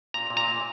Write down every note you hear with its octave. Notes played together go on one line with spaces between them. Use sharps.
A#2 A#5
A#2
A#5
A#2